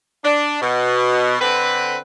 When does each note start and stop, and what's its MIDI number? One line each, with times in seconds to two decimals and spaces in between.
0.25 0.58 62
0.62 1.37 47
1.40 1.97 50
1.40 1.97 60
1.40 1.97 71